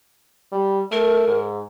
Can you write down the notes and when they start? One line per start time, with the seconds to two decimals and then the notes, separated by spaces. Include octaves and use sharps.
0.52 G3
0.92 A3 A#4
1.28 G#2